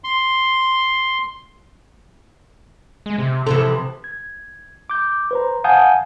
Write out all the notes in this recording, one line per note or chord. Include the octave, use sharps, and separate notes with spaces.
C6
G#3
C3
C3 E3 F3 A4
G#6
D6 G6
B4 C5 A#5
F5 F#5 G#5 A5 D#6 G6